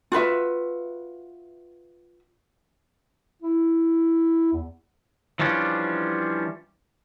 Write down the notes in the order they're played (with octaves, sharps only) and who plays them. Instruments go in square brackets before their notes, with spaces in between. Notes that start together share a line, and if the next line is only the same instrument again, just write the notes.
[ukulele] F4 F#4 B4 E5
[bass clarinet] E4
E2
[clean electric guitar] E3 F3 G3 C#4 D4 F4